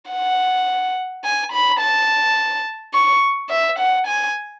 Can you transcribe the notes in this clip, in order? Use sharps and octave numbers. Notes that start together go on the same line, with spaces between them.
F#5
G#5
B5
A5
C#6
E5
F#5
G#5